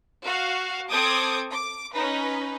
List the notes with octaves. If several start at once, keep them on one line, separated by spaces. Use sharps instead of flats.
F#4 F5
C4 A4 D6 D#6 G6 G#6
D6
C#4 D#4 B4